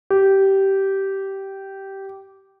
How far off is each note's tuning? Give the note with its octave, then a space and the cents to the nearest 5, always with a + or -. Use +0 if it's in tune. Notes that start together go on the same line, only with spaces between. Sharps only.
G4 -15